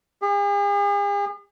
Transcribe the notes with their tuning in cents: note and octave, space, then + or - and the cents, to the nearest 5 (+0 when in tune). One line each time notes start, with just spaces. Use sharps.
G#4 -45